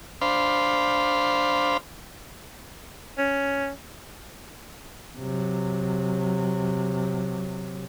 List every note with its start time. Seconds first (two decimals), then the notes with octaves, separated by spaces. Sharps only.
0.21 D4 C5 F5 B5
3.18 C#4
5.18 C3 F#3